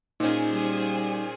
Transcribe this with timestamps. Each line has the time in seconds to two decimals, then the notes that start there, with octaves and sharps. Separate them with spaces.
0.20 A#2 C#4 D#4 G#4 C5
0.51 G3